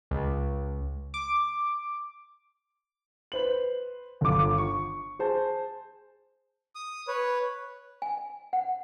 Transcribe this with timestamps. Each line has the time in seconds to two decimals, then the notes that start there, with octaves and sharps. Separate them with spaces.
0.11 C#2
1.14 D6
3.32 B4 C5 F#7
4.21 G1 F4 D6
4.58 C#6
5.19 G#4 C5 A5
6.75 D#6
7.08 B4 C#5
8.02 G#5
8.53 F#5